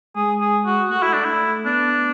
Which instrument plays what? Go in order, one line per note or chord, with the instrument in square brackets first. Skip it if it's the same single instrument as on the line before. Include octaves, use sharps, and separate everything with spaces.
[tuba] G#3 [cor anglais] G#4
[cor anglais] G#4
F#4
[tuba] A3 [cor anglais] F#4
[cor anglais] E4
D4
E4
[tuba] B3 [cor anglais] D4